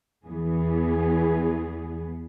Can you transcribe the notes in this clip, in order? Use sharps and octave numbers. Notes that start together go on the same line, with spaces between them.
E2 E3 B3 G#4